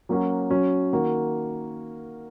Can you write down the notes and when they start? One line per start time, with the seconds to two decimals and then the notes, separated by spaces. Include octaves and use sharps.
0.09 F#3 A#3 C#4 F#4
0.50 F#3 C#4 F#4
0.93 D#3 A#3 F#4